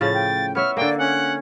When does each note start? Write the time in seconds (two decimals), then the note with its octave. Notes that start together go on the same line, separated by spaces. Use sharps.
0.01 A2 C#3 F3 C#5 A6
0.13 G5
0.55 B3 C#5 E5 F6
0.77 D3 A#3 D5 G5
0.98 C#4 F#5